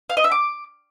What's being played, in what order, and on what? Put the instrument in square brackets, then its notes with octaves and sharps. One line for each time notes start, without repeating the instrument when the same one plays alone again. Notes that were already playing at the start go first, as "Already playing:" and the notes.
[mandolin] F5
D#5
E5
D6